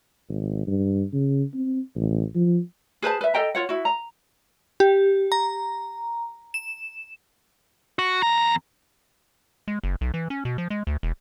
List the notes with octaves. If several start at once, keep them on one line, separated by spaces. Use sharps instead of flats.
G#1
G2
C#3
C4
A1
F3
G#4 B4 C5 A5
B4 E5
A4 D#5 G5 A#5
F4 C#5 F#5
E4 F#4
A#5
G4
A#5
E7
F#4
E2 A#5
G#3
F#1
B1
E3
C#4
B2
F3
G#3
D2
E1